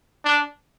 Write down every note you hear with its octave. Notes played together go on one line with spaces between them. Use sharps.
D4